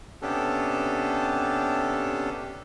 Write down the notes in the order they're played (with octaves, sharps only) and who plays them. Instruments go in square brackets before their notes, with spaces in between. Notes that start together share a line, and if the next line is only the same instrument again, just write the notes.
[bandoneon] C3 B3 C#4 D4 G4 A4